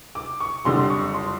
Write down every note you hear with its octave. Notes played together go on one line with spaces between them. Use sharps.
D6
C#6
F#1 F2 D3 G3 C6
C#6
C6